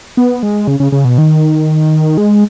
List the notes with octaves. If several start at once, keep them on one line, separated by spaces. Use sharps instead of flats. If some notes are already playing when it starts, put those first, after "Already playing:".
B3
G#3
C#3
C#3
C#3
B2
D#3
G#3